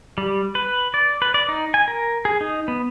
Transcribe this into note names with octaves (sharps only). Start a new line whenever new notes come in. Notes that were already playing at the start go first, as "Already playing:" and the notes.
G3
B4
D5
B4
D5
D#4
G#5
A#4
G#4
D#4
B3